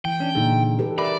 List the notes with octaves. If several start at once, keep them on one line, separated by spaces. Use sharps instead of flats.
E3 G5
C#4 D4
A#2 D3 D#4 G#4
G4 A4 B4
A#4 D5 E5 B5